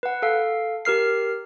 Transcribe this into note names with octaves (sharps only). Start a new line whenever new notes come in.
B4 F#5
A4 F5
G4 A#4 F6 C7